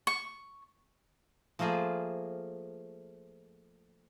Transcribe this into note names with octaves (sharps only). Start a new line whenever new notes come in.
C#6
F3 A3 A#3 F4 G#4 C5